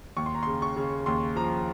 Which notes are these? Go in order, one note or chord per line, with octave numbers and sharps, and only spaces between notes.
D#2 C#6
C6
A#5
C6
C#3
C#6
C#3
D#2 C6
F3 A#5